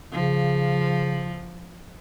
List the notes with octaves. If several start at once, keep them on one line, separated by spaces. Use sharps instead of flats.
C#3 F3